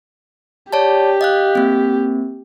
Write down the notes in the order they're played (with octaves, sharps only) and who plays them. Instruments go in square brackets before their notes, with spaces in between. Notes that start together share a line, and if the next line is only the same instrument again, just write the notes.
[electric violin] G4 [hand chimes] C#5 D5 A5
[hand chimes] D#5 F5 F#6
A#3 C4